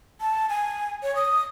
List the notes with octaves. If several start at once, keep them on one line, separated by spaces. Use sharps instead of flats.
A5
G#5
C#5
D#6